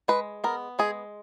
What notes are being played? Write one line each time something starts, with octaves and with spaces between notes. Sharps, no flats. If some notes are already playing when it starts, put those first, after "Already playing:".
G#3 B4
B3 A#4
G#3 G#4